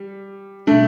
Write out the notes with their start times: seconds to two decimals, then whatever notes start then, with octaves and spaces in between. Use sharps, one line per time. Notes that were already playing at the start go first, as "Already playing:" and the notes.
Already playing: G3
0.67 B2 G3 A3 D4